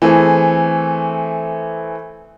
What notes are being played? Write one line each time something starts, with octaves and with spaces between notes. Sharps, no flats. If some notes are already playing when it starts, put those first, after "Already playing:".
E3 A3 C4 G#4 A4